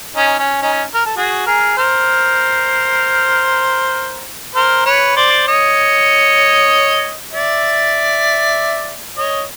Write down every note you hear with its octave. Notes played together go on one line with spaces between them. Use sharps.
C#4 D#4
C#4
C#4 D#4
A#4
A4
F#4 G#4
G#4 A#4
A#4 C5
A#4 C5
B4 C#5
C5 D5
C#5 D#5
D5 E5
C#5 D#5